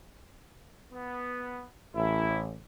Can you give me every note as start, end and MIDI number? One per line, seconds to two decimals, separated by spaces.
0.92 1.63 59
1.95 2.54 33
1.95 2.39 64